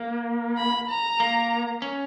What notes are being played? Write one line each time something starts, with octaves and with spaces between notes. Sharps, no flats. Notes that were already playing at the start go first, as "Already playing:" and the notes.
Already playing: A#3
B5
A#5
A#3
C#4